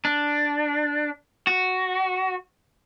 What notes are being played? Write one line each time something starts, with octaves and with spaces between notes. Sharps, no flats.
D4
F#4